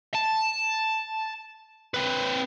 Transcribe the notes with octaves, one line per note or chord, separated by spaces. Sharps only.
A5
C4 B4